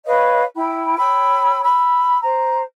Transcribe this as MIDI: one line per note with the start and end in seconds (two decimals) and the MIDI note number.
0.05 0.41 71
0.05 0.41 73
0.05 0.41 75
0.05 0.41 77
0.55 0.95 64
0.55 0.95 79
0.55 0.95 83
0.98 1.61 73
0.98 1.61 79
0.98 1.61 83
0.98 1.61 88
1.63 2.19 83
1.63 2.19 88
2.21 2.61 72
2.21 2.61 82